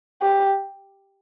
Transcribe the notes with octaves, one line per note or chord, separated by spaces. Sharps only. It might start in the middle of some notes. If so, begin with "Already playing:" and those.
G4